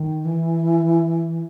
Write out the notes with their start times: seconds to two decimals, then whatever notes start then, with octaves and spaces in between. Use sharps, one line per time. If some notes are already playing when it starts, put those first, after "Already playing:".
Already playing: D#3
0.25 E3